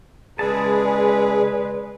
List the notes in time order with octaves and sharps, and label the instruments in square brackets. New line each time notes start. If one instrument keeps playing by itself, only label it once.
[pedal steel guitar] C#3 E4 A5 [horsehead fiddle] G#3 B4 [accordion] G#4 [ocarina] D5